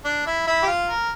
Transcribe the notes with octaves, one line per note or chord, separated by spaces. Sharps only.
D4
E4
E4
G4
F4
A#4